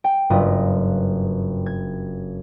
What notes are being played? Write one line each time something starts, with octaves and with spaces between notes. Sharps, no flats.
G5
F#1 G2 F4 B4 D#5
G#6